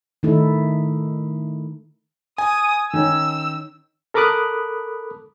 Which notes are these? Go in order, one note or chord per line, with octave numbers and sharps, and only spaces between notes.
D#3 A3 D#4 E4 A4
G#5 D#6
D#3 C#4 E6
A4 A#4 B5 D6 D#6 F#6